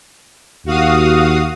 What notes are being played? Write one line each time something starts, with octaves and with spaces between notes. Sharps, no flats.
D#2 F#4 F5 D#6